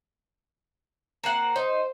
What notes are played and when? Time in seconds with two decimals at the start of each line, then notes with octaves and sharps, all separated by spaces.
1.24 A#3 C4 F#5
1.56 D#4 C5